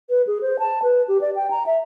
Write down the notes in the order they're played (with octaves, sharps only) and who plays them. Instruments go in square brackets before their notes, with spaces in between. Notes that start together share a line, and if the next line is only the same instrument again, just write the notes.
[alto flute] B4
G#4
C5
A5
B4
G4
D5
G5
A#5
E5